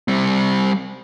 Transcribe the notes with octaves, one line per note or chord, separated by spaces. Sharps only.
G3 C4